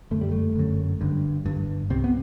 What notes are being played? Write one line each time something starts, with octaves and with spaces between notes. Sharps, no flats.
G1 F#2 A3
G3
A3
G1 F#2
G1 G2
G1 G2
C2 C3 C4
B3